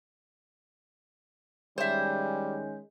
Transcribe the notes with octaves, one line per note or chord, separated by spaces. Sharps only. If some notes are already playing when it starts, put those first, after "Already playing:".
D#3 G3 G#3 C#4 C5 E5